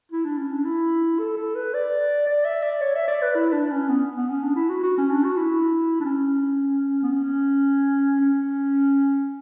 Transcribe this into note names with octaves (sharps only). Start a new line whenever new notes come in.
E4
D4
C#4
D4
E4
A4
A4
B4
D5
D5
E5
D5
C#5
E5
D5
B4
E4
D4
C#4
B3
B3
C#4
D4
E4
F#4
F#4
C#4
D4
F#4
E4
D4
C#4
B3
C#4
C#4